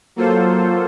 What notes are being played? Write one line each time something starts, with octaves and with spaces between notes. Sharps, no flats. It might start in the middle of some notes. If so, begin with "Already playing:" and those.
F#3 A#3 F4 A4 C5